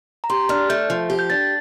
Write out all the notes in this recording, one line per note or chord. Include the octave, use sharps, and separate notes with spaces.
A#5
G4 C6
D4 F6
A3 G6
F3
G4
G6
D4 A6